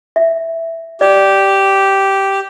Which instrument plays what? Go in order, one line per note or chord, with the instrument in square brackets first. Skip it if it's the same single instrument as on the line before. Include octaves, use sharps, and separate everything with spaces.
[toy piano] E5
[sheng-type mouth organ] G4 [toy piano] D5